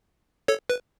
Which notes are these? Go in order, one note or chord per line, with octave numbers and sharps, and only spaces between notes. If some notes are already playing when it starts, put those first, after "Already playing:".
A4 C#5
B4